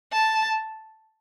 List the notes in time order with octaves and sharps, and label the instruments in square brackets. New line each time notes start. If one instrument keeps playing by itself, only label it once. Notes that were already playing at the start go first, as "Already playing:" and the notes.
[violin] A5